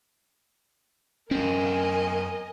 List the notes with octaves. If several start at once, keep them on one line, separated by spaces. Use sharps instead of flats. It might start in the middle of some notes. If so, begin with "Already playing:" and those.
F#2 C4 C#4 A#4 D#5 G#5